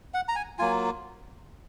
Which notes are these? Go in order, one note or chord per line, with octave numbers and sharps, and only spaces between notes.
F#5
A#5
G#5
F#3 A#3 F4 G#5